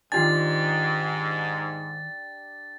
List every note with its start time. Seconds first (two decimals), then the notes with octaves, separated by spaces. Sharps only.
0.12 G#2 D#3 D4 F4 G4 G#5 A6